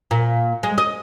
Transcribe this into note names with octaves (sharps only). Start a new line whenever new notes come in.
A#2
G#3
D#5